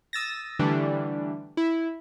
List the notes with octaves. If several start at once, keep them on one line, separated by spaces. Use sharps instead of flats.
D#6 E6 A6 A#6
D3 E3 G3 A3 D4
E4